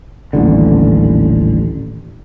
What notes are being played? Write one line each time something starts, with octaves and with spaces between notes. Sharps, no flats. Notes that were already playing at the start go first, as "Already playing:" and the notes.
D#1 A1 D3